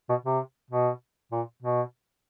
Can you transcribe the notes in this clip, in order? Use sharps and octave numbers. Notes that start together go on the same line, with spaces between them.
B2
C3
B2
A#2
B2